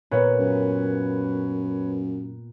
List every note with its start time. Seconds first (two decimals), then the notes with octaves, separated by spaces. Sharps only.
0.11 A#2 A#3 B3 B4 C#5
0.39 F#2